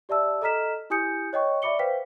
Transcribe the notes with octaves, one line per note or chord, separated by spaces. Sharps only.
G4 D5 E5 A5 E6
A4 D#5 A#5 F6 B6 E7
E4 G4 G#5 D#6 G6 C#7
C#5 D#5 G5 C#6
D5 E5 B5 D6 C#7 G7
B4 C5 F5 G5 B6